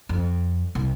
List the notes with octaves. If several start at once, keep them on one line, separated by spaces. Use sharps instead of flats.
F2
C2